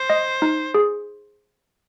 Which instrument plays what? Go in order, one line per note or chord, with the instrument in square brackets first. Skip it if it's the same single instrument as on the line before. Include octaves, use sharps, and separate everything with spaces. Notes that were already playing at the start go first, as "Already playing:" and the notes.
Already playing: [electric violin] C5
[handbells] D#5
D#4
G#4